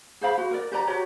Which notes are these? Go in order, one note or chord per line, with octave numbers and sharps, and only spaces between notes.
G#4 C5 F5 B5
F#4
A#4 D5
G4 B4 D5 A#5
F#4 G4 C#5 A#5